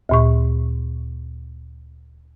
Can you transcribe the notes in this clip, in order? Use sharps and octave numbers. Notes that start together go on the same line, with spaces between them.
D2 A#2 C#6